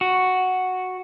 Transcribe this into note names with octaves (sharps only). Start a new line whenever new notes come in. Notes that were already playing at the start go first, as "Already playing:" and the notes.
F#4